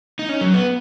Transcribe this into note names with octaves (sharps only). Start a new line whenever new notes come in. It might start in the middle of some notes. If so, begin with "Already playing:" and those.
D#4
C#4
F#3
B3